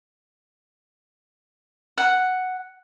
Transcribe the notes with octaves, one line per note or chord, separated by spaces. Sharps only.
F#5